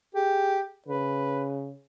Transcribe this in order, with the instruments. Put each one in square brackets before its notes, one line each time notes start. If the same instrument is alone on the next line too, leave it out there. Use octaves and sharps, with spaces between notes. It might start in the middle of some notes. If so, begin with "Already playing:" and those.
[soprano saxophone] G4 [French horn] G#4
[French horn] C#3 [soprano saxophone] B4